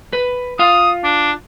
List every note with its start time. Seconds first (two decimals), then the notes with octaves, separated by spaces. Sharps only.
0.13 B4
0.59 F4 F5 D#6
1.04 D4